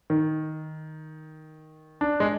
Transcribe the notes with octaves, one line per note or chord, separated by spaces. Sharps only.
D#3
D4
G#3